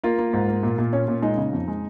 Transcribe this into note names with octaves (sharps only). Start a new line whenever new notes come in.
A#3 F4
A#3
G#2
A#3
A#2
A#2
C#4
A#2
G#3 D#4
C#3
F2
G#3